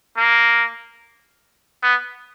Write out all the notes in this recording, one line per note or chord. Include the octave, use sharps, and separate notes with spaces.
A#3
B3